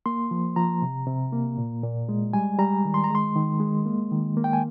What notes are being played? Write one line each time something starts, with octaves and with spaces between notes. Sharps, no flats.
A#3 C6
F3
F3 A#5
C3
C3
A#3
A#2
A#2
G#3
G3 G#5
G3 A#5
D#3
C6
A#5
G#3
C6
D#3
G#3
A#3
D#3
A#3
G5
G#5